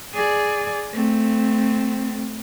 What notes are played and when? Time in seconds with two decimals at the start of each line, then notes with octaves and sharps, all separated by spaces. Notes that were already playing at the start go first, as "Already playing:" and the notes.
0.14 G#4 D5
0.93 A3 C4